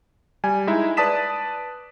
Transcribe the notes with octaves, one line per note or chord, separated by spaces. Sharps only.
G3 G#5
G#3 D#4 E4 E5
B4 D5 A5 D#6 B6 E7